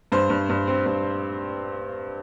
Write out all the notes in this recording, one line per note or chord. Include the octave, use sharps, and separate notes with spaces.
G2 C5
G2
G2
C4
G2